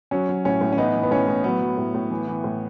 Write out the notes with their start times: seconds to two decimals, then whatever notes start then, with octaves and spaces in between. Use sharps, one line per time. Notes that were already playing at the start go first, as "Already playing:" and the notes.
0.11 F#3 C#4
0.29 F#3
0.45 A2 C#4
0.61 A2
0.72 C#4
0.77 E3 B3 D#4
0.95 E3
1.03 B3
1.11 A2 C#4
1.28 A2
1.44 F#3 B3
1.61 F#3
1.78 A2
1.94 A2
2.10 E3
2.28 E3
2.44 A2